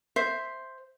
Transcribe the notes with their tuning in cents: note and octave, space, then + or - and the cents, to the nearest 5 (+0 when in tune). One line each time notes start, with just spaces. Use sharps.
C5 +0 E5 +0